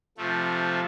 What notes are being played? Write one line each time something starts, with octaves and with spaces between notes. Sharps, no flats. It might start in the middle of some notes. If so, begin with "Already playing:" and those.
C3 F3 A3